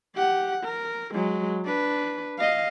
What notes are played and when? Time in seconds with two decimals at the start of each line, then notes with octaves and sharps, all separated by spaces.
0.15 G4 F#5
0.65 A#4
1.14 F#3 G#3
1.65 D4 B4
2.38 D#5 F5